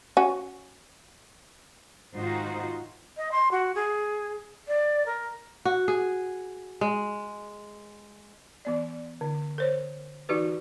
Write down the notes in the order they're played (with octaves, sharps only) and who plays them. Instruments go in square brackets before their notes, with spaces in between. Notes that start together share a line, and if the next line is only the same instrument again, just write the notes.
[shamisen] C#4 F#4
[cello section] G#2 D#3 D#4 F4 F#4 C5
[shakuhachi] D#5
C6
F#4
G#4
D5
A#4
[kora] F#4
G#4
G#3
[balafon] E3 B3 D5
D3
A#4 C5 C#5
E3 D#4 F#4 G4 B4